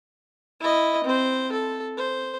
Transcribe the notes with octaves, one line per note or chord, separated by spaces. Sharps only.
E4 D#5
C4 C5
A4
C5